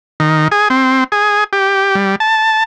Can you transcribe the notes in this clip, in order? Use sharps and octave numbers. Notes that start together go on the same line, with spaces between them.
D#3
G#4
C4
G#4
G4
G3
A5